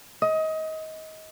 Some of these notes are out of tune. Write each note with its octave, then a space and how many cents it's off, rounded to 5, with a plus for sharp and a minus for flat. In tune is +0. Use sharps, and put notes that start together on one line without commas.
D#5 +25